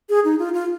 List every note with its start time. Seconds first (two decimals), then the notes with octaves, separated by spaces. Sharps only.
0.09 G#4
0.25 D#4
0.39 F4
0.54 F4